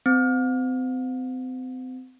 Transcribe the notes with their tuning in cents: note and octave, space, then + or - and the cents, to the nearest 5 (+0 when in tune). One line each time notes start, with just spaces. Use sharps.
C4 -35